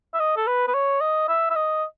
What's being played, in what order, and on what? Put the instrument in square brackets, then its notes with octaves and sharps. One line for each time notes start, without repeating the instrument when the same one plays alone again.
[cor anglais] E5
D#5
A4
B4
B4
C#5
D#5
E5
E5
D#5